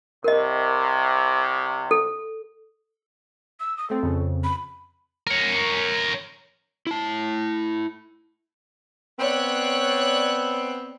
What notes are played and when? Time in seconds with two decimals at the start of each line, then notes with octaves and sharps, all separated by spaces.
0.24 C2 C3 A#4 D#5
1.91 A4
3.60 E6
3.77 D#6
3.90 A3 C4 A4
4.03 F2 C#3
4.44 B5
5.27 A#4 C#5
6.87 E4 A5
9.19 B3 C4 C#5 D5 F#6